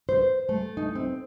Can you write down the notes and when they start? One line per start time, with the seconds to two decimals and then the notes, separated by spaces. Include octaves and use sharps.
0.09 C5
0.49 A3
0.77 D#4
0.95 C4